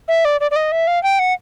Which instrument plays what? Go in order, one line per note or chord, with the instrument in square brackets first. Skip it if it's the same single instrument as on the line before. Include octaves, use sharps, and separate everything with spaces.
[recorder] E5
D5
D5
D5
D#5
E5
F5
G5
F#5